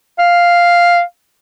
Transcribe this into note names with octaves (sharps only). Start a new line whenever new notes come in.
F5